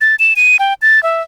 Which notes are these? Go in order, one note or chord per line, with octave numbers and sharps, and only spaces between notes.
A6
E7
D#7
G5
A6
E5